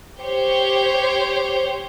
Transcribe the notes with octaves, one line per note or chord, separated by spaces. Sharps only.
G4 C5 C#5